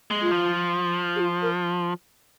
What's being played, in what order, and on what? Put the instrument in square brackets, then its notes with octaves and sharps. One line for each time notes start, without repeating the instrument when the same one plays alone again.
[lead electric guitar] G#3
[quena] F4
[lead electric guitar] F3
[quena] G#4
F4
A#4